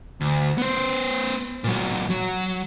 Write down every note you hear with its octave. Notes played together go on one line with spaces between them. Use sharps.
D2
B3 C5
A#2 F#3
F#3